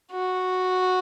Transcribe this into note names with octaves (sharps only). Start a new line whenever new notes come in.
F#4